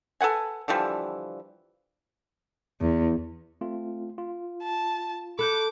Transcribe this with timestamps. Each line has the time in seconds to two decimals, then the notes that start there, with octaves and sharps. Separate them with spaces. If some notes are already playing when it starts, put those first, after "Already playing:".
0.21 A4 B4 F#5 G#5
0.68 D3 E3 F3 G3
2.81 E2
3.61 A3 C4 F4
4.18 F4
4.63 A5
5.39 A4 B5 D6 F#6 G6